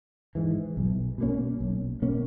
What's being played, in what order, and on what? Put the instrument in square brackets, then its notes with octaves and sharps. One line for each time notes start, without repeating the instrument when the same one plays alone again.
[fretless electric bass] G#2 E3
B1
B2 A#3 C#4
B1
B2 A#3 C#4